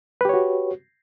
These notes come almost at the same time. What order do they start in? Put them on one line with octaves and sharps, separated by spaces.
B4 G4 C#5 F#4